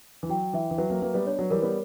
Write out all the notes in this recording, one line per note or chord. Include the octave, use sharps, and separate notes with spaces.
E3
F#3 G5
E3 E5
E3
F#3 B4
F#3 A#3
F#3 A#3 B4
G3 B3
B3 D4 C#5
F#3
E3 G3 A#4
G3 B3